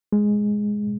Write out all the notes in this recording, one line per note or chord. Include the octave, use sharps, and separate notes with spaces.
G#3